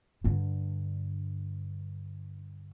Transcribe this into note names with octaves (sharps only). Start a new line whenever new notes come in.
G2 D3